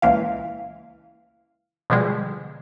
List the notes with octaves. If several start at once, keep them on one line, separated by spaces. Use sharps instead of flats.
C#2 A#2 E3 F5
B2 D3 F3 G3 G#3